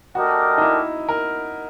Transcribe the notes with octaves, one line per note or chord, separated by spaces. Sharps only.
A3 D4 F#4 G4 A#4 D#5
D#4
E4
A#4